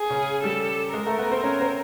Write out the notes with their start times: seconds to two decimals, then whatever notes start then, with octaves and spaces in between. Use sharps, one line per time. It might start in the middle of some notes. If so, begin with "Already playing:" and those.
Already playing: G#4
0.10 C#3 C#4
0.43 G3 G4 A4
0.93 G#3 G#4 A#4
1.06 A3 A4
1.18 B3 B4
1.31 C4 C5
1.44 C#4 C#5
1.60 C4 C5